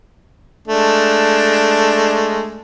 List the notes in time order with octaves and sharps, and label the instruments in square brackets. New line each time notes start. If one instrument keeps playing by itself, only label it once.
[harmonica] G#3 A3 D4